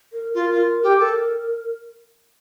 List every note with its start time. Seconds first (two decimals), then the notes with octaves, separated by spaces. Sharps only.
0.13 A#4
0.34 F4 A#4
0.50 F4
0.82 G4
0.98 A4 A#4